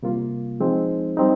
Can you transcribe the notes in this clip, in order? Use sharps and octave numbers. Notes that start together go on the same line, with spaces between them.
C3 G3 A#3 F4
F3 G#3 C4 D#4
G3 C4 D#4